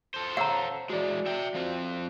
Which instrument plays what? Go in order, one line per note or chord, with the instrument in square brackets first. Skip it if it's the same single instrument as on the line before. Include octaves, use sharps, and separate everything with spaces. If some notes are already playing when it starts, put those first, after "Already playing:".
[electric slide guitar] A4 C5
[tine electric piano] C#5 F5 E6 [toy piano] F#5 A#5
[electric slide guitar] E3 G#3 [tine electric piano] F#4 D5
[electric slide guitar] E5 G5
F3 C4 F4